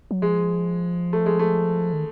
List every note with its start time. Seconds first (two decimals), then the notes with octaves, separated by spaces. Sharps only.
0.11 F#3
0.22 F3 G#3
1.13 A3
1.26 G#3
1.39 A3
1.93 D#3